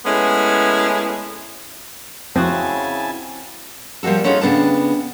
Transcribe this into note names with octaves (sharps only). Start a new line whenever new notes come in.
G#3 A3 B3 C#4 E4
F2 C#3 C4 E4 F#4 G#5 A5
F3 G3 A#3 F#4 A4
A3 C#4 D#4 F4 F#4 G#4
F2 C#3 B3 D4 A5